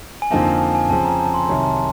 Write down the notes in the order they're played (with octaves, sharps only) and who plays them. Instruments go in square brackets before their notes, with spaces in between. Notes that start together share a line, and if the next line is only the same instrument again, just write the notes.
[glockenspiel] G#5
[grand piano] F2 D3 F3 A#3 D#4 [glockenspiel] A5
[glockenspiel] G#5
A5
G#5
[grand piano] F2 C#3 F3 [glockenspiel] A5
[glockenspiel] A#5
A5
C6
[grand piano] C2 C3 D#3 F#3 [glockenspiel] A#5
[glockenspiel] A5